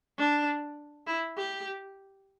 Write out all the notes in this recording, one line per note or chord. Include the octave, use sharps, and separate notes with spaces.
D4
E4
G4